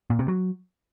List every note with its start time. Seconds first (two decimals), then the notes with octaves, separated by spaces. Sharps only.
0.10 A#2
0.19 C3
0.28 F#3